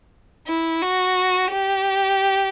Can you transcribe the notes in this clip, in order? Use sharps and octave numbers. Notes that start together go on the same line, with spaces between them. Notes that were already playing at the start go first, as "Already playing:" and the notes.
E4
F#4
G4